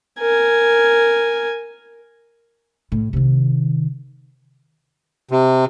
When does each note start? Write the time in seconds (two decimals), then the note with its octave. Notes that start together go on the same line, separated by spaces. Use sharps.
0.19 A#4 G#5
2.92 A2
3.13 C3 D#3
5.31 C3